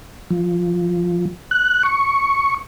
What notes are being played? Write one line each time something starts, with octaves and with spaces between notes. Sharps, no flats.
F3
F#6
C#6